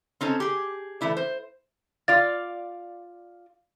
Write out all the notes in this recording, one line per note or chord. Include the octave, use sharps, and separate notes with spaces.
C4 C#4 D#4 A4
G4 G#4
E3 A3 E4 D5
C5
F4 D5 F5 A6